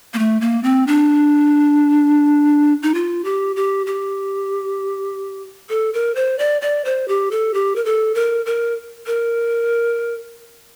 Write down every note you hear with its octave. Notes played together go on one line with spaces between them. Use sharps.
A#3
A3
A#3
C4
D4
D#4
F4
G4
G4
G4
A4
A#4
C5
D5
D5
C5
G4
A4
G4
A#4
A4
A#4
A#4
A#4